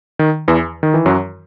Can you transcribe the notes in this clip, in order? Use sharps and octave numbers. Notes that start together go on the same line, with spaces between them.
D#3
E2 E3
D#3
E3
F#2 F#3